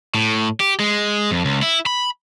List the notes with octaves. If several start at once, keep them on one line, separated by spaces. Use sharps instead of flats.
A2
G4
G#3
F2
C#2
E4
B5